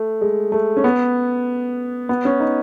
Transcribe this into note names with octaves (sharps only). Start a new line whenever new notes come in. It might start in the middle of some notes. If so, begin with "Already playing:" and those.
Already playing: A3
G#3
A3
C#4
B3
B3
C#4
D#4